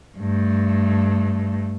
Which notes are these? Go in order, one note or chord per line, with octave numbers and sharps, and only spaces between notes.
G2 A3